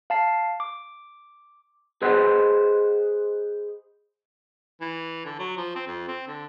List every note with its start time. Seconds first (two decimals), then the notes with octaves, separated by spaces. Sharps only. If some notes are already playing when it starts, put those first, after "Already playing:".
0.10 F5 A5 C7
0.60 D6
2.02 G#4 B4 C5 D#5 F#5
4.81 E3
5.25 D3
5.39 F#3
5.57 F3
5.76 C4
5.87 F2
6.08 C4
6.28 D3